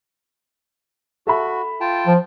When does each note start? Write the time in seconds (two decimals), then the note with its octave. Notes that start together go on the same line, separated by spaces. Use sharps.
1.27 F#4 A4 E5 B5
1.81 F4 G5 A5
2.07 F3